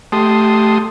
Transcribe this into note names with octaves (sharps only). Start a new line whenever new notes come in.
A3 G4 A5 C6 D#6